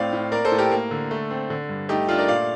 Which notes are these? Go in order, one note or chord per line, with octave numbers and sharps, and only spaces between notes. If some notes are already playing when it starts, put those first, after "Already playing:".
Already playing: A2 C4 D5 F5
A2
A#3 A#4 D5
A4 C5
A2
G4 A#4
A#3
D3
A3
C4
D3
G2
A3 D#4 G4
A3 D4 F4
A#4 D5
A#2 D5 F5